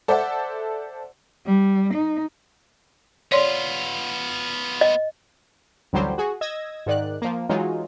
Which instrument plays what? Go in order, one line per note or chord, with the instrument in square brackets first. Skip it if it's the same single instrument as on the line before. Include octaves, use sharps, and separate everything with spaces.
[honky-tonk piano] A4 C5 D5 E5 F#5
[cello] G3
D#4
[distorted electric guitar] B3 F4 [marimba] C#5 D5 C6
[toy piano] D#5
[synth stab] A1 D2 D3 F#3 G3 C5
F#4 G#4
D#5 E6 G#6 A#6
G#2 D#3 D5 F#6
F3 A#3
E3 F#3 G#3 D#4 F4